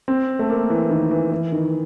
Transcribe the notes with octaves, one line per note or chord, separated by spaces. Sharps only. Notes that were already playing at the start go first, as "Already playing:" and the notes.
C4
A3
A#3
E3
D#3
E3
E3
D#3